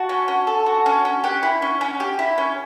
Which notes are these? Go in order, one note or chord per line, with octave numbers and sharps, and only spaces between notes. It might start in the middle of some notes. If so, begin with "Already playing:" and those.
Already playing: F#4 A5
C#4
C#4
A4
F#4
C#4
C#4
G4 F#5
E4
C#4
C#4
G4
E4
C#4